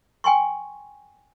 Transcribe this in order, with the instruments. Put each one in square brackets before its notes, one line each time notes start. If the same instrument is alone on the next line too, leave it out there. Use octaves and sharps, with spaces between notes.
[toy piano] G5 G#5 C6 C#6